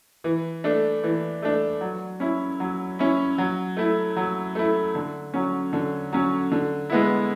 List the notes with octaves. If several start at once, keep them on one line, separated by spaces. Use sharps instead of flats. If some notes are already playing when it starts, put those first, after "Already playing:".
E3
A3 D4
E3
A3 D4
F#3
C#4 E4
F#3
C#4 E4
F#3
A3 E4
F#3
A3 E4
D3
F#3 C#4
D3
F#3 C#4
D3
G#3 B3 E4